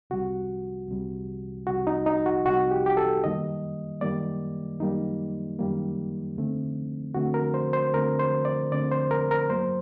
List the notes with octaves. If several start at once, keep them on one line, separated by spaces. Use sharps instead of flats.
C2 C3 G3 F#4
C2 C3 G3
C2 C3 G3 F#4
D#4
D#4
F#4
C2 C3 G3 F#4
G4
G4
A4
F#2 D#3 G3 A#3 D#5
F#2 D#3 G3 A#3 D5
F#2 D#3 G3 A#3 D#4
F#2 D#3 G3 A#3
D2 D3 A3 C4
D2 D3 A3 C4 F#4
A#4
C5
C5
D2 D3 A3 C4 A#4
C5
D5
D2 D3 A3 C4 D5
C5
A#4
A#4
G2 F#3 A#3 C5